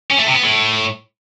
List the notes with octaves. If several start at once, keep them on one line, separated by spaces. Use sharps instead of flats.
C#4
A3
C3
B3
A2